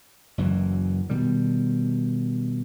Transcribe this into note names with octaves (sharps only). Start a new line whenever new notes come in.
F#1 F#2 E3
B2 D#3 G3